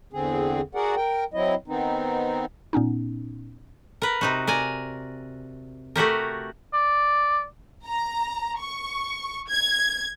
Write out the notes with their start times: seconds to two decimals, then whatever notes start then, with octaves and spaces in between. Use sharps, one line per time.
0.13 E2 D3 C4 G#4
0.75 F#4 G#4 A#4 D5 F#5
0.97 A#4 G5
1.34 F#3 C4 E4 D#5
1.68 D#3 B3 C4 D#4
2.73 A#2 B3 C#4 D#4
4.02 A#4 B4
4.21 C3 D#4 F#4
4.47 A#4 D5 G#5
5.96 A3 F#4 G4 A#4
6.73 D5
7.87 A#5
8.59 C#6
9.49 G#6